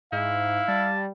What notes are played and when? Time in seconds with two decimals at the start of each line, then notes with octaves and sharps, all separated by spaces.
0.12 G#2 E4 F5
0.68 G3 A5